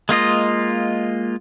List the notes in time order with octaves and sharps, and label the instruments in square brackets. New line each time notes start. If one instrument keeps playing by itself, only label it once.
[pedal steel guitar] G#3 A#3 F4 D#5